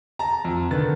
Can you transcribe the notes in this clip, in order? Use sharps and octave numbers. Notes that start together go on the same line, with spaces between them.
A5 A#5
F2
D3 D#3 B4 A6